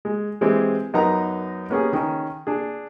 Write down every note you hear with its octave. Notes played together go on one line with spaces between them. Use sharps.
G#3
E3 G#3 C4 G4
F#2 B3 D#4 A#4 A#5
A#3 B3 C#4 G4 G#4
D#3 C#4
D4 G#4